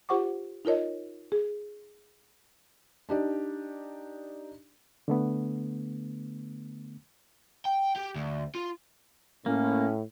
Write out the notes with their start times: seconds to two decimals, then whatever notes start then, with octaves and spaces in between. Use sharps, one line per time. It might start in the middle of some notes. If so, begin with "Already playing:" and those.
0.09 F4 G4 C5 F#5 C#6 D6
0.65 D#4 F4 A#4 C#5 D#5
1.32 G#4
3.09 D4 D#4 G4 D5
5.08 D3 A3 B3
7.65 G5
7.96 G4
8.15 D2
8.55 F4
9.46 A2 A#3 C#4